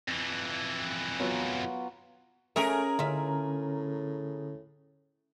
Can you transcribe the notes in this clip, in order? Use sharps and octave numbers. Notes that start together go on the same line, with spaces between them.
F2 E3
F#3 B3 F4
A3 C#4 G#4 A#4 C#5 E5
A2 D3 C#4 F4 E5